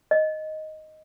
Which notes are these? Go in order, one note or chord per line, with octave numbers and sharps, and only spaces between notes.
D#5